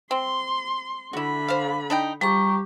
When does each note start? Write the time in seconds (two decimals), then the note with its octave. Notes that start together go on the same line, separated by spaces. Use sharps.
0.11 C4 C6
1.13 D3 E4 F#4 B5
1.48 C5 F5
1.90 D4 D#4 G5
2.21 F3 G3 G4 A#5 C#6